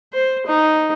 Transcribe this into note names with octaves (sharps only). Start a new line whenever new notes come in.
C5
D#4